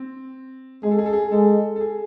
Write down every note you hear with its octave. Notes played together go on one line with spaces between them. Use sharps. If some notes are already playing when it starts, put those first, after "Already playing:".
Already playing: C4
G#3 G#4
A4
G#4
A4
G#4
G#3 A4
A4
G#4